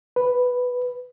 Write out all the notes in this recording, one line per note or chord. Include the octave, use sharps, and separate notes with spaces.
B4